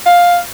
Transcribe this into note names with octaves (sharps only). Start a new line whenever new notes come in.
F5